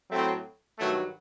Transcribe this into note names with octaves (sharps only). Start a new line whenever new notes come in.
A2 F#3 A3 C4
G2 D#3 F#3 A3